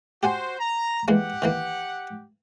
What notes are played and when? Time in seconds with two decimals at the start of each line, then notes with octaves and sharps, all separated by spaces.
0.23 F#4 G4 C5 F#5 G#5
0.58 A#5
1.08 E3 G#3 A#3 G4 F#5
1.42 D#3 E3 A#3